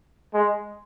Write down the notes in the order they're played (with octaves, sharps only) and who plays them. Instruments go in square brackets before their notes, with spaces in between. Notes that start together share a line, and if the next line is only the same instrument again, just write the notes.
[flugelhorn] G#3